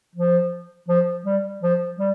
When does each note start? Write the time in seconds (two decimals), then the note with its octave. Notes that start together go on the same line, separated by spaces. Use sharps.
0.15 F3
0.88 F3
1.25 G3
1.63 F3
1.99 G3